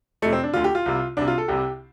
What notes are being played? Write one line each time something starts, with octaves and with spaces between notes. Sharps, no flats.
F2 C3 A3
C4
D4
D2 D3 F4
G4
F4
C2 C3
C2 C3 D4
F4
A4
C2 C3 G4